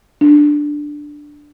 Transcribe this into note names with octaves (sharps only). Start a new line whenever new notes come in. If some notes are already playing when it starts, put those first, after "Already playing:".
D4